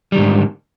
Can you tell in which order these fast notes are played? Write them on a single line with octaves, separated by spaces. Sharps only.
G3 D#3 G#2 D3